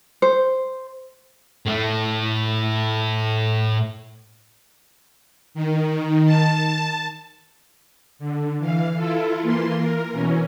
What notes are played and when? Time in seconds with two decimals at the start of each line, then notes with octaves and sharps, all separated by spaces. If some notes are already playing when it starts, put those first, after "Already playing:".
0.22 C5
1.66 A2 A3
5.54 D#3
6.26 A5
8.19 D3
8.59 E3 F5
8.96 E4 F4 A4
9.41 E3 A#3 F4 C6
9.77 A#4
10.12 B2 E3 C#4